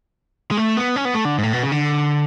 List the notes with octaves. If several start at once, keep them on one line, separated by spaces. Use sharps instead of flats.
G#3
A3
B3
C#4
B3
A3
D3
G#2
A2
B2
C#3
D3